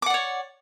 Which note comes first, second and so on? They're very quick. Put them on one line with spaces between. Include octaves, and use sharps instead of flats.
D6 F#5 D5 C#5